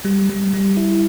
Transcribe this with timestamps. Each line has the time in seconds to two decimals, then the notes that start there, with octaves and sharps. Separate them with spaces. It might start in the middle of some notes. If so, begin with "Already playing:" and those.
0.05 G3
0.29 G3
0.53 G3
0.77 E4